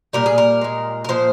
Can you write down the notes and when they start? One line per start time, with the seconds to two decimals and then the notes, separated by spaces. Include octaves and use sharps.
0.13 A#2 G3 A#4
0.26 G#4
0.38 A#4
0.61 A#2 G#3
1.05 A#4
1.09 A#2 F3 G#3 C5